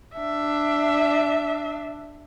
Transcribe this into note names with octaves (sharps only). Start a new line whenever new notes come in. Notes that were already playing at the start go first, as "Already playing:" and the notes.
D4 E5